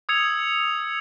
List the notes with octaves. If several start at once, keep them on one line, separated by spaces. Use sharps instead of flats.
D#6 E6 G#6 C#7 F7